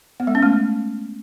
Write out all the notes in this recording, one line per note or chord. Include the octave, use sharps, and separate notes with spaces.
B3
G#3
C#4
A3